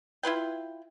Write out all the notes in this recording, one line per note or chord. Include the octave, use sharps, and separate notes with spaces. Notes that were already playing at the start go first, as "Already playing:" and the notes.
E4 F4 B4 G5